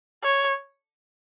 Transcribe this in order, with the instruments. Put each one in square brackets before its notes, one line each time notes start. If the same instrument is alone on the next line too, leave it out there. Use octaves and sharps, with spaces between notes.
[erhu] C#5